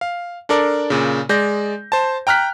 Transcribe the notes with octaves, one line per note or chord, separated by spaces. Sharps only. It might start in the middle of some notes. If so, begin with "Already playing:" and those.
F5
D4 A4 A#4 D5
A#2 C#3
G#3 D5 G6 A#6
C5 A5
G5 A#5 F6 F#6 B6